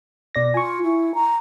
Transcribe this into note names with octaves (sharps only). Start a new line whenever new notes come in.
B2 D5 A#6
F4 G#5 C#6
E4
A#5